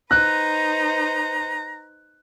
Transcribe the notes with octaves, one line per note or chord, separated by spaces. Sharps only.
D#4 B4 C5 A#5 F#6